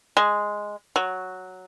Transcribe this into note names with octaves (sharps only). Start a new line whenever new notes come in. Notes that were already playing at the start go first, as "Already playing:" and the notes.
G#3
F#3